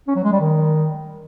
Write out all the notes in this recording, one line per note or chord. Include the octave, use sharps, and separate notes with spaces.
C#4
F#3
G#3
G3
D#3